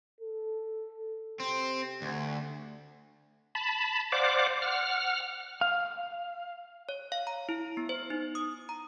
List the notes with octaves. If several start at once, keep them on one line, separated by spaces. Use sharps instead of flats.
A4
C3 C4
D2
A5 B5
C5 D5 F5 F#5 D6
F#5 F6
F5
C#5
F5
A#5
E4
B3
C5
D#4
D#6
A#5